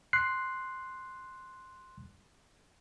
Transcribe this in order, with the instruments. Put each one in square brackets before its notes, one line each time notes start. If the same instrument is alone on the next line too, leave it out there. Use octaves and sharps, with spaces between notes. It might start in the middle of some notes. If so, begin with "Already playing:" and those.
[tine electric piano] C6 F#6 C7